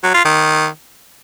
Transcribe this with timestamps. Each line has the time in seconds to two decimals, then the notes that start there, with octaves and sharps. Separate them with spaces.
0.03 F#3
0.14 F4
0.25 D#3